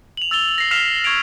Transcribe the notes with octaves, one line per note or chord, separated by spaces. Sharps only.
F7 F#7
E6 A6 F7 G7
A#6 C7
F6 B6 C7 E7 F7
C#6 G#6 A#6 D7 F7